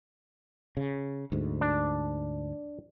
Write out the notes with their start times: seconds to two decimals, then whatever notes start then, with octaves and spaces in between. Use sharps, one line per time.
0.77 C#3
1.32 D2 G#2
1.61 D4